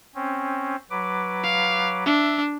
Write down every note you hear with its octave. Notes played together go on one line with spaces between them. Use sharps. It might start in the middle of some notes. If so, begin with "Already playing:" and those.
C4 C#4
F#3 B4 D6
F5
D4 E5